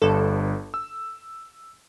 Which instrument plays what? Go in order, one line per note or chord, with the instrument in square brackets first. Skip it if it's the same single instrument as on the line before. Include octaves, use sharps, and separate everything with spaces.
[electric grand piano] G1 G2 [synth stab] A4
[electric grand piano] E6